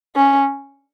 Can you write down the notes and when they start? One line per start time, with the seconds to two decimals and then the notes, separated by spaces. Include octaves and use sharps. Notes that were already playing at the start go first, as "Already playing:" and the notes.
0.16 C#4